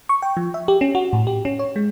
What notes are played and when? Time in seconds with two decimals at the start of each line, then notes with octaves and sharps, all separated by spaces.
0.09 C#6
0.22 G5
0.37 F3
0.54 E5
0.68 G4
0.81 C#4
0.95 F#4
1.13 A2
1.27 G4
1.45 C#4
1.59 C#5
1.76 G#3